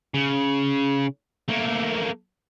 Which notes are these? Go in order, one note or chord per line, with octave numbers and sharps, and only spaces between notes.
C#3
A3 A#3